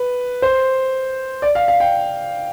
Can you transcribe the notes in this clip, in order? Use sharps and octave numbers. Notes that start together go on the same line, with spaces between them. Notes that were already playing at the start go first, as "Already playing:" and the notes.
Already playing: B4
C5
D5
F5
F5
G5